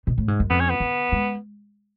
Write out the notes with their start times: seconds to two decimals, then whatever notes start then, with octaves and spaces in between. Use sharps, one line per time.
0.07 B2
0.18 A2
0.28 G#2
0.40 F#2
0.50 F2 B3
0.60 C#4
0.69 B3
0.80 D3
1.12 G#3